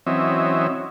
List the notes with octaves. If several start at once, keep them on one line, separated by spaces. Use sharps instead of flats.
E3 F#3 C4 C#4 D#5 E5